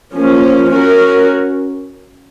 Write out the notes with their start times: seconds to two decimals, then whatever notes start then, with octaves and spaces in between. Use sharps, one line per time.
0.15 F3 A#3 C#4
0.71 C#4 F#4 A#4